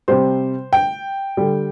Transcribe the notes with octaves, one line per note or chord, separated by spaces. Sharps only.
C3 G3 C5
G5
D3 G3